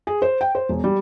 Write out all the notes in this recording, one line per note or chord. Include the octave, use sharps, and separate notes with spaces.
G#4
C5
G5
C5
E1
G3